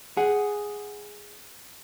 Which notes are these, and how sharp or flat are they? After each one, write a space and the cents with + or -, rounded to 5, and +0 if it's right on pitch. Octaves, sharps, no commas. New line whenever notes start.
G#4 +0 F#5 +0